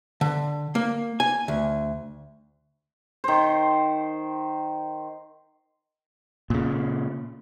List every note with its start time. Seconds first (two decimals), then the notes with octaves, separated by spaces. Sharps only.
0.21 D3
0.75 A#3
1.20 G#5
1.48 D2
3.24 D#3 C5
6.50 A#2 C#3